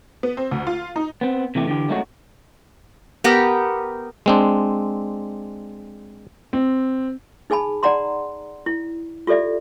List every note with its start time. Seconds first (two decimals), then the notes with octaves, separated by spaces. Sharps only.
0.23 B3
0.37 C4
0.51 D2
0.67 F4
0.96 D#4
1.21 B3 C4
1.55 C3 E3 A3 G4
1.67 D3 E3 G4
1.89 F#3 G#3 A3 C#4 D#4 F#4
3.24 B3 G4 A#4
4.26 G#3 C4 D4
6.53 C4
7.50 D#4 G#4 G#5 A5 B5
7.83 D#4 D5 F#5 A#5 C6
8.66 E4
9.27 F4 G4 A4 D5 E5